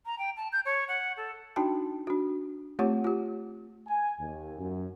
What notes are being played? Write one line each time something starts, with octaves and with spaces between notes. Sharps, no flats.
A#5
G5
A5
G6
C#5
F#5
A4
D4 D#4 F#4 G5 A5
D4 F#4
A3 C4 F4 G4 C#5 F#5
F4 G4
G#5
D#2
F#2